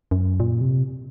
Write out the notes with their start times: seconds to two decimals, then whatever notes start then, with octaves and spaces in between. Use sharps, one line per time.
0.11 F#2
0.40 A#2
0.61 C3